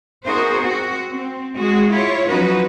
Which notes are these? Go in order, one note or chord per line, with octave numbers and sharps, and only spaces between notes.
B3 D#4 F#4 G#4 A#4 C5
C4 F#4
C4
G#3 F#4 G#4
E4 F4 C#5
F3 F#3 C#4 D#4 F#4 B4